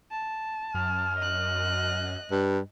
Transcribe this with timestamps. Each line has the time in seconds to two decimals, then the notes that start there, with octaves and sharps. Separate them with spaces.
0.11 A5
0.74 F#2 F6
1.18 D#5 F#6
2.31 G2